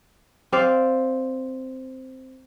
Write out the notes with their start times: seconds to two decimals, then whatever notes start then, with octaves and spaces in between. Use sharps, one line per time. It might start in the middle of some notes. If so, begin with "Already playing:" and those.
0.52 C4 D5 F5